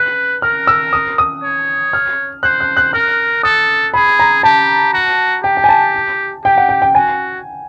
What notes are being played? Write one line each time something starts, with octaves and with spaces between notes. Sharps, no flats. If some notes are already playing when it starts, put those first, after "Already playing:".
Already playing: B4 F#6
A#4 F6
E6
D#6
D#6
C#5
F6
C5 F#6
F#6
F#6
A#4 F6
A4 D#6
G#4 B5
A#5
G4 A5
F#4
G4 G5
G5
G#5
A5
G4 G5
F#5
G5
G5
F#4 G#5